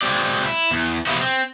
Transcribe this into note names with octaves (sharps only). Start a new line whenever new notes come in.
F#3 G#3 C4 D5
E4
E2
F2 C3 E3 A#3 B3 E4
C4